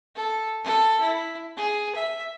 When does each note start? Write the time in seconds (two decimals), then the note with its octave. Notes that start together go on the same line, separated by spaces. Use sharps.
0.16 A4
0.64 A4
1.01 E4
1.57 G#4
1.95 E5